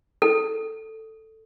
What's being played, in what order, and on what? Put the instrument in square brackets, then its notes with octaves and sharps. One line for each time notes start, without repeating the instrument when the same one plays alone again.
[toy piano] A4